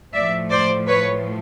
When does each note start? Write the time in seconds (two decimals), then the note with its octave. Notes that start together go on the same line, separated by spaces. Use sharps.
0.13 A2 F3 A3 D5 E5
0.50 C5 D5
0.87 B4 C#5